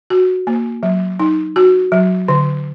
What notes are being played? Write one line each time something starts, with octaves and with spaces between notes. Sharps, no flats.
F#4
A#3
F#3
D#4
F#4
F#3
D3